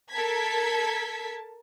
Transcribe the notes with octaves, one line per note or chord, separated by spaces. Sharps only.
A4 A#4 A5 G#6 B6